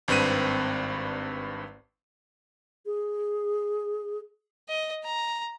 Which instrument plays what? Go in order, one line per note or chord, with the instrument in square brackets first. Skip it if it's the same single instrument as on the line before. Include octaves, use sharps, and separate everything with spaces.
[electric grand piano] G#1 G2 C4 B4 D#7
[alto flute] G#4
[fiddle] D#5
A#5